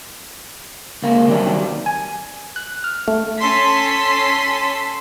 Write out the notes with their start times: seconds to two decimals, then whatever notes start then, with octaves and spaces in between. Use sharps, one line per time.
1.02 C#2 A#3
1.27 C3 D#3 F#3 G3
1.86 G#5
2.56 F#6
2.84 F6
3.08 A3
3.41 C#4 A4 C6 B6